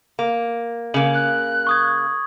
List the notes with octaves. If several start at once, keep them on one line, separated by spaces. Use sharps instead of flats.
A#3
C#3 A#3 F#7
F#6
C#6 D#6 G#6